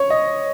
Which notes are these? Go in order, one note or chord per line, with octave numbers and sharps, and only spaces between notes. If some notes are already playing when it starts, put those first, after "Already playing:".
Already playing: C#5
D#5